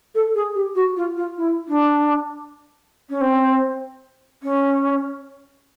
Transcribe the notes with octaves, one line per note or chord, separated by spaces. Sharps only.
A4
G#4
G4
F#4
F4
F4
E4
D4
C#4
C4
C#4